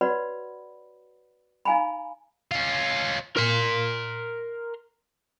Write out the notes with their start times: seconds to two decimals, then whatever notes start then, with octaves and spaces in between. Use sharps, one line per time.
0.01 F#4 B4 C#5 D5 F#5 B5
1.65 D#4 F5 G#5 A#5 B5
2.52 C#4 F4
3.37 A#4 C6